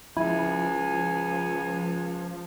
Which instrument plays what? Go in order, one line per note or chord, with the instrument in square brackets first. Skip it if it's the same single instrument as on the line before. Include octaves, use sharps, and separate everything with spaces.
[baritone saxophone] C#2 [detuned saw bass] F3 [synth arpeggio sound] E4 [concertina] G#5